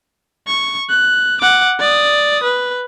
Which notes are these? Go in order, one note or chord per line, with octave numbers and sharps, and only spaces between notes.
C#6
F#6
F#5 D6
D5 D#6
B4